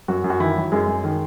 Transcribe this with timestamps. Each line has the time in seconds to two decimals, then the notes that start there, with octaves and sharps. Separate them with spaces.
0.08 F#2 F#3 F#4
0.24 F#2
0.30 F#4
0.40 D#3 E3 E4
0.56 F#3
0.72 F#2 G#3 G#4
0.88 F#2
1.04 D#3